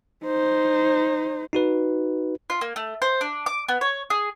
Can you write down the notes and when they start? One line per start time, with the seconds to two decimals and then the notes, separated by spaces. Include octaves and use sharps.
0.24 D#4 C5
1.53 D#4 F#4 B4
2.50 F4
2.61 A#3
2.76 A3
3.02 C5
3.21 D4
3.46 D6
3.69 B3
3.81 C#5
4.10 G#4